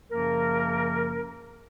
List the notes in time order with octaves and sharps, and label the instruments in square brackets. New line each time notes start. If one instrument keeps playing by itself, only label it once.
[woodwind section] F#2 C#3 F3 A#3 A#4